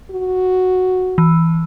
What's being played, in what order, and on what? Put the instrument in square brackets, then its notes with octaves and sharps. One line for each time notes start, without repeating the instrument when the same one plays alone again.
[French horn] F#4
[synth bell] E3